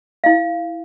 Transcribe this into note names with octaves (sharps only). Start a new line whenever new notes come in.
E4 F5